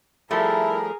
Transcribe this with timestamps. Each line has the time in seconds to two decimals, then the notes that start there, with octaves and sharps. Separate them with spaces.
0.31 F3 G3 A3 E4 G#4 A#4 A5